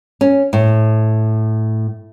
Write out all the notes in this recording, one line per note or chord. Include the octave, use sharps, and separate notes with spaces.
C#4
A2